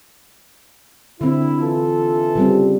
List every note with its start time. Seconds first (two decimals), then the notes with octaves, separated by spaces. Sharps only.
1.21 D3 C4 E4
1.61 E3 F4 A4
2.35 C#3 G3 C4